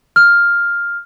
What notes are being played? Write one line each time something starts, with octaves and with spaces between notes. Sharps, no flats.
F6